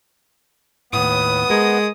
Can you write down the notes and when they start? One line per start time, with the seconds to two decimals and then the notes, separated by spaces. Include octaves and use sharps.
0.93 D#2 A2 B3 D#6
1.50 G#3 A#4